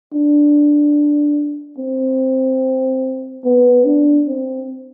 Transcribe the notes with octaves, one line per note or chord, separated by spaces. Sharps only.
D4
C4
B3
D4
C4